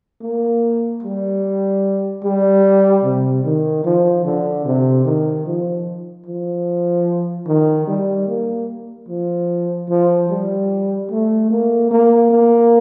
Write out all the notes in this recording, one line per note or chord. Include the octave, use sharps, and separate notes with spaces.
A#3
G3
G3
C3
D#3
F3
D3
C3
D#3
F3
F3
D#3
G3
A#3
F3
F3
G3
A3
A#3
A#3
A#3